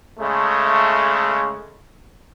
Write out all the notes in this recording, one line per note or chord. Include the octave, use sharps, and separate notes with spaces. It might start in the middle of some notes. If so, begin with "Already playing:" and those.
C#3 G#3 A3